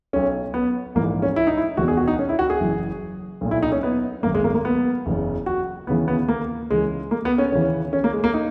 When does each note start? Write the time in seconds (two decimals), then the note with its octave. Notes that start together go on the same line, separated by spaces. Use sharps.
0.13 B1 B2 C#4
0.54 B3
0.95 A#1 G#2 E3 A#3
1.22 C#4
1.36 E4
1.47 D#4
1.57 E4
1.77 E1 E2 B2 F#4
1.88 G#4
1.97 F#4
2.08 D#4
2.19 C#4
2.29 E4
2.39 F#4
2.50 G#4
2.60 F#1 F#2 E3
3.41 B1 A#2
3.51 E4
3.63 D#4
3.72 C#4
3.83 B3
4.23 G#1 F#2 D#3 A#3
4.35 G#3
4.44 A#3
4.55 A#3
4.65 B3
5.06 F#1 E2 C#3
5.46 F#4
5.87 D#2 C#3 E3 B3
6.08 B3
6.28 A#3
6.70 C#2 C#3 E3 G#3
7.11 A#3
7.25 B3
7.38 C#4
7.52 D#2 C#3 E3 C#4
7.93 C#4
8.04 A#3
8.13 G#3
8.24 A#3
8.34 D#4